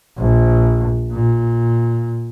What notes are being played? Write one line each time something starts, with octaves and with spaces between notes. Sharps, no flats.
A#1
A#2